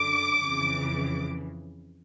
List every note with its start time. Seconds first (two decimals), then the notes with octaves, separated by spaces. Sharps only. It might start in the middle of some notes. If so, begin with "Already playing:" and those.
Already playing: F#2 D3 D6
0.48 F2 C#3 E3